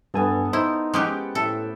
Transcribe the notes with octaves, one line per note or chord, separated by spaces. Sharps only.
G2 B3 A4 G#5
D#4 E4 C5
G#3 C#4 G4 F#5 G5 D6
A2 A4 E5